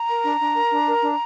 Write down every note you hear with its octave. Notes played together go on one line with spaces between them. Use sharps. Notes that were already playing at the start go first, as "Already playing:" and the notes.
Already playing: A#5
A#4
D4
D4
A#4
D4
A#4
D4